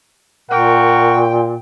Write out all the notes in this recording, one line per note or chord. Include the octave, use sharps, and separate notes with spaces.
A#2 A#4 F#5 G5 C#6